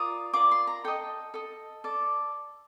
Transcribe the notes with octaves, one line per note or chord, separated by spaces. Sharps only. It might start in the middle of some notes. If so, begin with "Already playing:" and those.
Already playing: F4 A#4 D5 D#6
F4 A#4 D5 D6
C6
A#5
A4 D#5 G5
A4 D#5
A4 D5